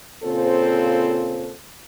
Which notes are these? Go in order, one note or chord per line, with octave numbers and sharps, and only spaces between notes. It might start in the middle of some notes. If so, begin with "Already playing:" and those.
A#2 C#3 C4 F4 A4 C5